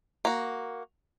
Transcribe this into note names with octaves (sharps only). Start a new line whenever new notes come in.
A#3 F#4